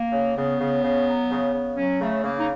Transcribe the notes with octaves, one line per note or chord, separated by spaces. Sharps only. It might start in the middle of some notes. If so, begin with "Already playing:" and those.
Already playing: A#3
C#3
C#3 B3
C#3
C#3
F#3
C#3
C#3
F#3 C#4
C#3 A3
C#3 A#3
D#4